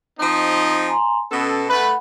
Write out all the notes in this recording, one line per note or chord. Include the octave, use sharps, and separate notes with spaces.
F3 C4 D#4
G#5 A#5 C6
B2 B3 C#4 A4
A3 B4 F#5 B5